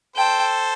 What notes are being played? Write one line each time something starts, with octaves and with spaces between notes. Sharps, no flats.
A4 C5 G5